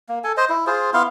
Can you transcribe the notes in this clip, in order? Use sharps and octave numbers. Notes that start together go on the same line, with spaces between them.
A#3
A4 G#5
C5 D#5
E4
F4 G#4 C5
B3 E4 F5 C6